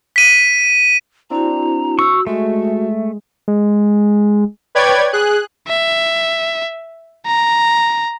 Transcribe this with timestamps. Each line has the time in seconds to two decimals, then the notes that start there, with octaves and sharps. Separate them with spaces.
0.16 B6 D#7
1.30 C4 D4 E4 F#4 A#5
1.99 F#4 C#6 E6
2.27 G#3 A3 F#4 E5
3.48 G#3
4.75 B4 C#5 D5 G5 G#6
5.13 G#4 F#6
5.68 E5
7.26 A#5